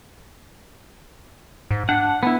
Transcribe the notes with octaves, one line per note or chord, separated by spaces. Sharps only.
G#2
D4 F#5
B3 E4